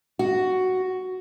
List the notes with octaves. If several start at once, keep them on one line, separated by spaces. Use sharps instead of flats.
F#4